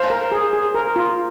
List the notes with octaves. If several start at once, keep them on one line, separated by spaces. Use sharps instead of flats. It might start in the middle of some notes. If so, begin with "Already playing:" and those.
Already playing: C5 F5
A#4
G#4
G#4
A#4
F4